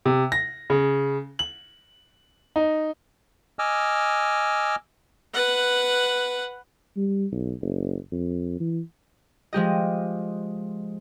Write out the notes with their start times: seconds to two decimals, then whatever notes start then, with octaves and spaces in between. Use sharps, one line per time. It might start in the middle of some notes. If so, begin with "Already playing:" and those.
0.05 C3
0.32 A#6
0.70 C#3
1.39 F#7
2.56 D#4
3.59 D#5 G#5 D6 E6 F6
5.34 B4 F#5
6.97 G3
7.32 B1
7.62 F#1
8.12 F2
8.60 E3
9.53 F3 G#3 G4 D#5